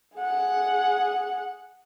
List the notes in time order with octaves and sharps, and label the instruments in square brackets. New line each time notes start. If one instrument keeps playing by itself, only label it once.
[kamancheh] G#4 F#5